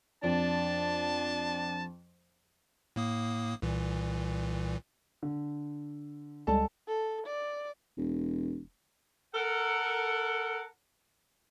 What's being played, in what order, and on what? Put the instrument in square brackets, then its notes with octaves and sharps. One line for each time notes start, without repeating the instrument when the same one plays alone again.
[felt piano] F2 [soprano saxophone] D4 [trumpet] A5
[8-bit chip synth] A2 A#3 D#6
C2 A#2 E3
[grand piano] D3
[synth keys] C#2 G3 G#3 [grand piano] A4 A5
[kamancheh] A4
D5
[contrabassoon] E1
[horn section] A4 A#4 F#5